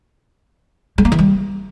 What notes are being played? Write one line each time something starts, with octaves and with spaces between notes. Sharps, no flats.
G#3
A#3
E3
G3